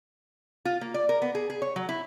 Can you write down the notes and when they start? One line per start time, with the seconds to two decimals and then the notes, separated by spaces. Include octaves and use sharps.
0.65 F4
0.81 A#3
0.94 D5
1.09 A#4
1.22 B3
1.35 G#4
1.50 G#4
1.62 C#5
1.76 F#3
1.89 E4